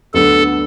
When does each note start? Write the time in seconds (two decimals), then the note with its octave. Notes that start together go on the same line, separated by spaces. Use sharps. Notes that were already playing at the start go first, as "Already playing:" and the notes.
0.14 D2 D3 F#3 B3 A4